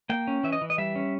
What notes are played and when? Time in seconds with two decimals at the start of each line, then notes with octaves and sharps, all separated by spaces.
0.10 A#3 G5
0.27 C#4
0.43 E3 E5
0.52 D#5
0.61 E3
0.70 D#5
0.78 G3 E5
0.95 C#4